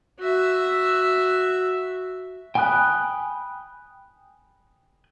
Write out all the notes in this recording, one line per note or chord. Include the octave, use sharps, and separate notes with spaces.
F#4 E5
G5 G#5 B5 D#6 F#6